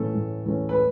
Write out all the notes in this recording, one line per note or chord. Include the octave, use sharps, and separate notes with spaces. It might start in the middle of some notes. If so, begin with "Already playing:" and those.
Already playing: A2 E3 A3 C#4 A4
A2
E3 A3 C#4
B4